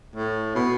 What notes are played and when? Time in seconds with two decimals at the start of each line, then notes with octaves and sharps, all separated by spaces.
0.16 A2
0.55 B2